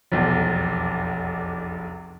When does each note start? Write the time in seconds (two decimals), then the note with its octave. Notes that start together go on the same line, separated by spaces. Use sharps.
0.12 F1 B1 E2